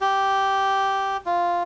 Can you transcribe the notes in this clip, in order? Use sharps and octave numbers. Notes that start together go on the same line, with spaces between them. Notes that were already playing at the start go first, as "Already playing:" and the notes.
G4
F4